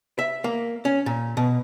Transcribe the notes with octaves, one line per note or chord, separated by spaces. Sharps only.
E5
A#3
C#4
A#2
B2